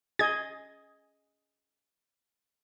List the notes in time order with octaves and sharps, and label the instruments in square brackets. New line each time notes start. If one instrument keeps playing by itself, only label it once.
[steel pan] G#4 D#5 [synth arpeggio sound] G#6